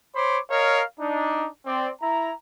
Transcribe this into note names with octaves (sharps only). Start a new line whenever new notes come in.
C5 C#5 B5 D6
A#4 C#5 D#5 F5
D4 D#4
C4 D5
E4 A#5